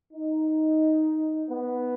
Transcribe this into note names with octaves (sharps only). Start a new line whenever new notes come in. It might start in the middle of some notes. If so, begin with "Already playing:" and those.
D#4
B3